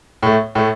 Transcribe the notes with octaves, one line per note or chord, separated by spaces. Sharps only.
A2 A3
A2 A3